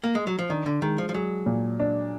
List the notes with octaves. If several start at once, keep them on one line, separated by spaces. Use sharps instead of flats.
A#3
G#3
F#3
F3
D#3 D4
D3
D#3 G#3
F3
F3
F#3 G#4
A#2
D4